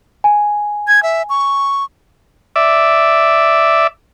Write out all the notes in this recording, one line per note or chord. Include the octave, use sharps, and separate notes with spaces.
G#5
G#6
E5
C#6
D5 E5